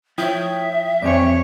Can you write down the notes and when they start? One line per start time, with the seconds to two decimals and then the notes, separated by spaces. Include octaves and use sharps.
0.18 F3 E4 C#5 E5 G5 D#6
1.02 B1 F2 C4 G4 C#5 D5 G#5